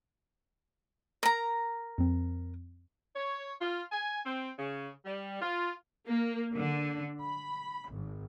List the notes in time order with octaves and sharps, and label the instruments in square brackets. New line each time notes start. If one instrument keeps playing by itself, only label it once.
[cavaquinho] A#4 A#5
[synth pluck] F2 C4
[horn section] C#5
F4
G#5
C4
C#3
G3
F4
[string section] A#3
D3
B5
G#1